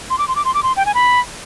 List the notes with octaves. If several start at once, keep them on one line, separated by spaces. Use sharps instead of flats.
C6
D6
C6
D6
C6
D6
C6
G5
G#5
B5